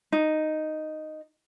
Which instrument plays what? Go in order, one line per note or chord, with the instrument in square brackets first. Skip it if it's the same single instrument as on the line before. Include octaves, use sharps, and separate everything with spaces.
[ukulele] D#4